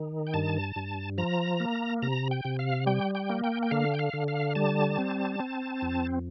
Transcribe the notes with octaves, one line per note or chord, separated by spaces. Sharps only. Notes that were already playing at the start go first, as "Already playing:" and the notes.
Already playing: D#3
G5
G2 A5
G2
F3 A#5
A#3
C3 A#5
G5
C3
F5
G3 G5
G5
A#3
G5
G5
D3 F5
G5
F5
D3
F5
G3 A5
C4
C4
F2